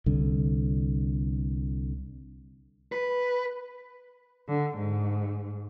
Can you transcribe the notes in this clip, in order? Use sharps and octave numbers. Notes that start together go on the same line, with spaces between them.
C2 D3
B4
D3
G#2